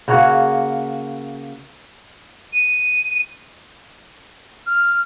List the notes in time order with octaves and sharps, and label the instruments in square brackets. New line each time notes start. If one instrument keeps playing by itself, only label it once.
[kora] C#3 A#3 F#4 C#5
[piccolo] D#7
F6